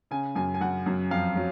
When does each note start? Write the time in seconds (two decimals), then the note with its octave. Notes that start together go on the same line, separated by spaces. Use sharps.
0.11 C#3 G#5
0.36 F#2 G#5
0.54 G#5
0.61 F#2 F#5
0.86 F#2
1.11 F2 F5
1.36 F#3